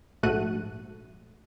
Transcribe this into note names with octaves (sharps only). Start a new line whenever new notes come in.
A#1 G#2 A3 F#4 F#6 D#7